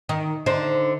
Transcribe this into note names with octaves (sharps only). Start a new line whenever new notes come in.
D#3
D3 D#4 C5